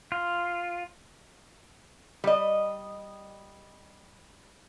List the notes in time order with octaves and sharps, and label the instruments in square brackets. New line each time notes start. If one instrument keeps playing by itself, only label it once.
[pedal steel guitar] F4
[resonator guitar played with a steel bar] G3 D#5